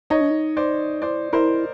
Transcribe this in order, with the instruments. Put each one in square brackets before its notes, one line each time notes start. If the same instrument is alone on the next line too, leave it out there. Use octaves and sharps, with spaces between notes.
[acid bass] D#4 [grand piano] C#5 D#5
[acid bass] D4
D#4
[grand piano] C5 D5
[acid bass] E4 [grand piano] C5 D5
[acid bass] E4 [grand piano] A#4 C5